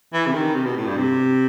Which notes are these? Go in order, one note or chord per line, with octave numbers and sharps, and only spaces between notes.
E3
C3
D#3
C3
B2
A2
G2
C3